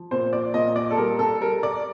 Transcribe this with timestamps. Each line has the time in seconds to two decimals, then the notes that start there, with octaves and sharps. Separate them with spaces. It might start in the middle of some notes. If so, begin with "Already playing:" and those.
Already playing: F3
0.11 A#2 C5
0.33 D5
0.54 A#2 D#5
0.76 D5
0.91 A4
0.98 G3 A#4
1.19 A4
1.41 G3 A#4
1.63 D5